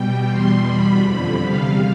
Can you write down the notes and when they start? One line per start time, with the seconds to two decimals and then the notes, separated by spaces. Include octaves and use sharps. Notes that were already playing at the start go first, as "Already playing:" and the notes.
Already playing: B2 G3 G5
0.27 E2 B2 G3 C6
0.65 E2 B2 G3 B5
1.03 F2 D3 F3 B5
1.42 E2 C3 G3 F5